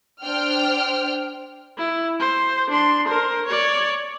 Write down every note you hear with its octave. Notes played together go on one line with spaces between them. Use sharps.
D4 C5 G5 F6
E4
C5
D4 C6
A#4 C5
C#5 D5